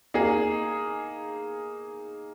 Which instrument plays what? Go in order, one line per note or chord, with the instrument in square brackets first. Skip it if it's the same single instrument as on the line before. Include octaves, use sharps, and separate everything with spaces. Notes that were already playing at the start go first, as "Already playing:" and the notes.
[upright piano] A#3 D#4 G#4